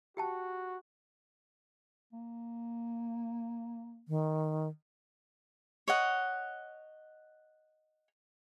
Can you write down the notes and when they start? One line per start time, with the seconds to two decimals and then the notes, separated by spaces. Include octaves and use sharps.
0.17 F#4 G4 G5 A5
2.13 A#3
4.08 D#3
5.88 C#5 D#5 F#5